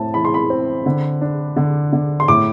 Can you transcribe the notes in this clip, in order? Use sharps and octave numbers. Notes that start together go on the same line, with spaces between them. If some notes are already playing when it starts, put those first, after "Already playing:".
Already playing: A2 C4 A5
E3 B5
C6
B5
C4
D3
D4
D3
D3
C6
A2 D6